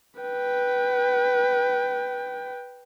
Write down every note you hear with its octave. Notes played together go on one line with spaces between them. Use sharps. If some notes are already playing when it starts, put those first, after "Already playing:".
B4 G5